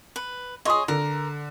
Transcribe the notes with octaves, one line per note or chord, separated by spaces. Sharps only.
B4
G#4 C#5 D#5 C6 D#6
D3 A#4